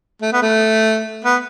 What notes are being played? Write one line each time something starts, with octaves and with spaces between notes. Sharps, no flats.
A3
B3
A3
B3